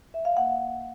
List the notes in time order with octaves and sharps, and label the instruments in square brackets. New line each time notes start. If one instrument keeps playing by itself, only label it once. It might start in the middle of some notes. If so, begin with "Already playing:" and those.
[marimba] E5
F5
A#3 F#5